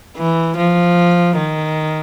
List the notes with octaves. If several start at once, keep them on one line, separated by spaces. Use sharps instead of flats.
E3
F3
D#3